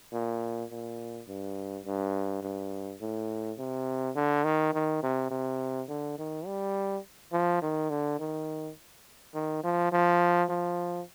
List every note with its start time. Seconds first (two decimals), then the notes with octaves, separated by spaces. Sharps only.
0.13 A#2
0.70 A#2
1.28 G2
1.86 G2
2.43 G2
3.01 A2
3.59 C3
4.15 D3
4.44 D#3
4.73 D#3
5.03 C3
5.31 C3
5.89 D3
6.18 D#3
6.46 G3
7.32 F3
7.62 D#3
7.90 D3
8.19 D#3
9.34 D#3
9.64 F3
9.92 F3
10.49 F3